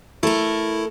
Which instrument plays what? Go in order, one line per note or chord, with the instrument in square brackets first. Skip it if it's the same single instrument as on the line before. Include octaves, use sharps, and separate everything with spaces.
[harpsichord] A3 [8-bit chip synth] E4 [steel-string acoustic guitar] A4 A#4